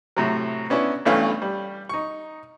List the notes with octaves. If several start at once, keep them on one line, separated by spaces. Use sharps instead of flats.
A2 C3 F#3
B3 C#4 D4 E4
B1 G2 E3 A3 C#4 F5
G3
D#4 C#6